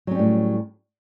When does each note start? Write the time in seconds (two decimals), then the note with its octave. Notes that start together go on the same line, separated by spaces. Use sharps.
0.07 F#3
0.11 C#4
0.15 G3
0.19 A2